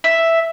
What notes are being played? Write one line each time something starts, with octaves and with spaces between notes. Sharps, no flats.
E5